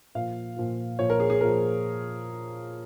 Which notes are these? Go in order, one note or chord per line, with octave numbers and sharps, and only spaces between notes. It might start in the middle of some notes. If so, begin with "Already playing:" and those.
A#2 F3 F5
A#2 F3
A#2 F3 C#5
A#4
G#4
G#4
A#2 F3 A#4